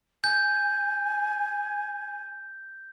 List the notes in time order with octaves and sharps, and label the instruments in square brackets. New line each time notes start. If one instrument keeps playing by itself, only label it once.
[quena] G#5 [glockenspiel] G6